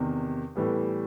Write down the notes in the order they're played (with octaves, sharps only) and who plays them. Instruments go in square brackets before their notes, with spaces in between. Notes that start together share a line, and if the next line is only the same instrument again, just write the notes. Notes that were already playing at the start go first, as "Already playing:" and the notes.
Already playing: [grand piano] E2 C3 D#3
A2 E3 G3 B3